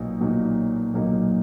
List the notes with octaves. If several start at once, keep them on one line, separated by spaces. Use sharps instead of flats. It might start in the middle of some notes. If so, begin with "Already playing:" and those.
Already playing: B1 A#2 F#3 A#3 D#4
B1 A#2 F#3 A#3 D#4
B1 A#2 F#3 A#3 D#4